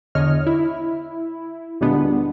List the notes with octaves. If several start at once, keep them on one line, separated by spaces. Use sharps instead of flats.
E2 D3 C#5 D#5 F6
E4
D2 A#2 G3 G#3 B3 D4